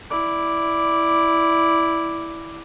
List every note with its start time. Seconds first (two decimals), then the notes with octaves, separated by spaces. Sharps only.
0.10 E4 D5